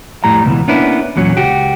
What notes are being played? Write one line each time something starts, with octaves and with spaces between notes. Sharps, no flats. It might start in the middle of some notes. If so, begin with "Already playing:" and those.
F2 A2 G3 A#5
C#2 B2 E3
A#3 B3 C#4 D4 E4
E2 A#2 F#3 C#4
C#2 F#4 G4